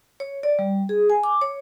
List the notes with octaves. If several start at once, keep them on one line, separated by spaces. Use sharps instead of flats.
C#5
D5
G3
G#4
G#5
D6
C#5